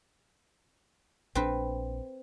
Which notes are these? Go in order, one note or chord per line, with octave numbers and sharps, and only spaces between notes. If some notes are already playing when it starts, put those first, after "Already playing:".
A#1 C4 D4 B4